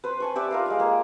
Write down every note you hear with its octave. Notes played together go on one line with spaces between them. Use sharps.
B4 C5
G#5 A5 C#6
G4 D5 E5 E6
F4 A#4 F5
G#3 F5
A#3